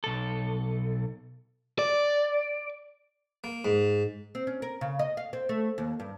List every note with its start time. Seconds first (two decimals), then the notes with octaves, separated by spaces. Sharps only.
0.04 B1 A4
1.79 D5
3.44 A#3
3.65 G#2
4.35 C4
4.47 C#4
4.62 A#4
4.81 C#3
4.99 D#5
5.17 F5
5.33 C4
5.49 A3
5.78 D#2
6.00 G2